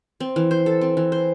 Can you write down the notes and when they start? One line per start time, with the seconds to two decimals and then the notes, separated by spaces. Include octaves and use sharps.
0.20 C4
0.36 E3
0.51 C5
0.66 A4
0.81 C4
0.97 E3
1.12 C5